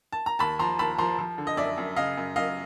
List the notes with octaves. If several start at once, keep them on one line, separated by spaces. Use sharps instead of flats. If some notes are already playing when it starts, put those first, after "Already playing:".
A5
A#5
D#2 A5 B5
F3 A#5 C6
D#2 A5 B5
F3 A#5 C6
F3
D3
D#5
F#2 D5 E5
F#2
C#3 D#5 F5
F#2
F#2 D#5 F5